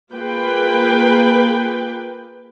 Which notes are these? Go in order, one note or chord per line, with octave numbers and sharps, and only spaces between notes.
A#3 F4 G#4 B4 G5